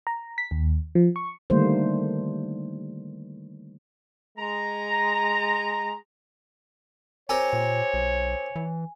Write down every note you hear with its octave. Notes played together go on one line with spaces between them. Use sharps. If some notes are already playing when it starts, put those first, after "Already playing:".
A#5
B6
D#2
F3
C#6
D3 D#3 G3 A3 A#3 C5
G#3 A#5
C4 G4 A#4 C#5 G#5
A#2
B1
E3